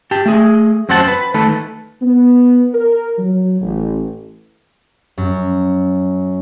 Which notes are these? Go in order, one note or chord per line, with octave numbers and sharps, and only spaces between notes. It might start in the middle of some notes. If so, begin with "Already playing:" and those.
G4 A5
A3 G#4
F#2 C4 C5 F#5 A5
B4
D#3 A3 A4 B4
B3
A#4
F#3
A1
F#2